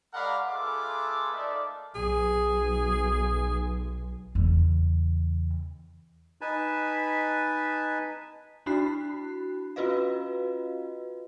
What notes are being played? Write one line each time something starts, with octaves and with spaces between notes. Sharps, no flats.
G#3 A#4 D5 F5 F#5 B5
A3 F4 G#4 A4 B4 D6
A#3 D#4 A4 D5 E5 F5
B1 G#4
E2 C#3
D#4 B4 G#5 A5 B5
D4 E4 F#4 B5 F#6 C7
C#4 F4 F#4 B4 D#5 F5